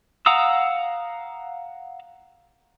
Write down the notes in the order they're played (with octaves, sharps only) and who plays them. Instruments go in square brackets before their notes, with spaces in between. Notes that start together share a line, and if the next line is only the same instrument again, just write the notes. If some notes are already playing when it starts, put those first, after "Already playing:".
[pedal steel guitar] F5 F#5 A#5 D#6 E6